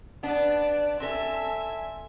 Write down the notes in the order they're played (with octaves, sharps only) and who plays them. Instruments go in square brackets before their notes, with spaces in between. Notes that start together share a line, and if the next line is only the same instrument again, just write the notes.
[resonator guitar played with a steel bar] B3 D4 [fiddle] D5 A5
[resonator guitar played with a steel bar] C4 A4 [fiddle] E5 G#5